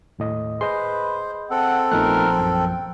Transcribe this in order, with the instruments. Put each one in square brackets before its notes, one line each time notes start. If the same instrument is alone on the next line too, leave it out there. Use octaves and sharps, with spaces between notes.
[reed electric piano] D#2 A2 D#5
[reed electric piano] G#4 D#5 [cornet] B4 [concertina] C5 [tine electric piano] C6
[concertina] C4 A4 [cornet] F#5
[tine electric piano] A#1 F3 F#6 [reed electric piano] A3 B3 D#4 [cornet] A#4
[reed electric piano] F#2 [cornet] G5